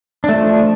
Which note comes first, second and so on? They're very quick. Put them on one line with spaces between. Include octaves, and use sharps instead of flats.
D4 A3 F3